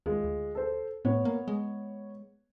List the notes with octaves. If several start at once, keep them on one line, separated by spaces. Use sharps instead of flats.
D#2 G#3 F4
D2
A4 C5
A2 B3 C#5
A#3
G#3